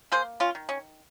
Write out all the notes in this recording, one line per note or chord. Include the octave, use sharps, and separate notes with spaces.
A#3 G#4 C5
C#4 F4
D#3
C#4